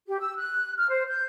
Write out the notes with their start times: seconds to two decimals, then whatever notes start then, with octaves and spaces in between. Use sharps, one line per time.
0.07 G4
0.20 E6
0.37 F#6
0.76 F6
0.89 C5
1.08 G6